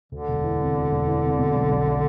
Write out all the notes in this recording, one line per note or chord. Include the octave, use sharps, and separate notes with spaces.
D2 D3
E1
E3
C3
D2
E1
E3
C3
B2
B1
B1
A3